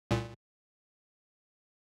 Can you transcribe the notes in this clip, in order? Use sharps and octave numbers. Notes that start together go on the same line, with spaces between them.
C2 A#2